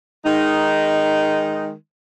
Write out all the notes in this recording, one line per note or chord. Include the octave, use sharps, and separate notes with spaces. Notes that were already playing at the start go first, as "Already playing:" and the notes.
D#3 G#3 D#4